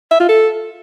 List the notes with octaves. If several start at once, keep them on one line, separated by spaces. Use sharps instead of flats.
E5
F4
A4